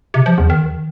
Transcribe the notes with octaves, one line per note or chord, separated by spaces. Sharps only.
C3
F3
E2
D#3